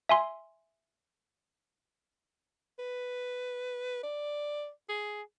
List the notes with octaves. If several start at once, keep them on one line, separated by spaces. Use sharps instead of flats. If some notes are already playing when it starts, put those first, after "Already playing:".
E5 G#5 C6
B4
D5
G#4